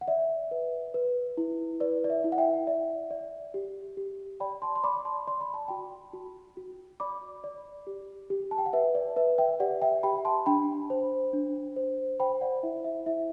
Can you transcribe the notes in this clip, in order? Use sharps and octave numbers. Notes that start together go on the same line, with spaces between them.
F#5
D5 E5
B4
B4
E4
B4 D5
D5
E5
E4
F#5
E5 G5
D5 E5
D5
G4
G4
D5 G5 B5
A5 C6
C6
D5 B5 D6
A5 C6
D5 C6
B5
A5
F#4 G5 B5
F#4
F#4
D5 B5 D6
D5
G4
G4
A5
G5
F#5
B4 E5
D5
B4 E5
E5 G5
G4 D5 F#5
E5 G5
G4 G5 B5
A5 C6
D4 G5 B5
C5
D4
C5
C5 G5 B5
D5 F#5
E4 E5
E5
E4 E5